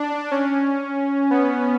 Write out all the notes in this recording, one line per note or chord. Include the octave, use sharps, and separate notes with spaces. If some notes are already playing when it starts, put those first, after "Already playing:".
Already playing: D4
C#4
B3